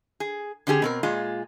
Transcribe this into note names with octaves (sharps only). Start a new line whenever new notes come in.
G#4
D3 C#4 G4 G#4
B2 C4 A#4
A#2 G#3 F4